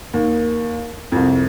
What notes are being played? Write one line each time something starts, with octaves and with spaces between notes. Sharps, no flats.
D#2
C2 F2